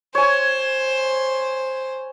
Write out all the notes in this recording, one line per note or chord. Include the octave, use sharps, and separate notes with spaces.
C5 C#5 G#5